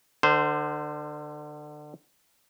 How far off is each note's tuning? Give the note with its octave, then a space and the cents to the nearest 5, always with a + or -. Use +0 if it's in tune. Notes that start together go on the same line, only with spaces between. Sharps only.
D3 +30 C5 -15